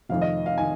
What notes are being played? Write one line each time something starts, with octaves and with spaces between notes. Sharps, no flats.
F1 F2 D#3 F5
D#5
F5
D#3 G#5